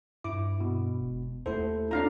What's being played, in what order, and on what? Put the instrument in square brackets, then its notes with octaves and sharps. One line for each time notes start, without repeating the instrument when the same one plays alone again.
[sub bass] G2 [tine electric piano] E4 [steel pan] D6
[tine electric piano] B2
[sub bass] E1
[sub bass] D#2 [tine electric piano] A3 E4 A4 [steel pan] C5
[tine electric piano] C#4 F4 A4 [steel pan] D4 F5 A#5